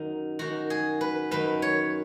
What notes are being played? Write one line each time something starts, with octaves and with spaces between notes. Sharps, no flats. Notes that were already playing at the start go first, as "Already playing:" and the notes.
Already playing: F#2 D#3 D#4
F#2 D#3 F#4
G#4
B4
F#2 D#3 B4
C#5